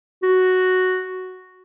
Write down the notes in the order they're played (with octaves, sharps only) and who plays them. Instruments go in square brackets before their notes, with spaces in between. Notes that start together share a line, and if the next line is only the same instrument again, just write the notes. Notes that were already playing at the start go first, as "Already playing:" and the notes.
[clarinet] F#4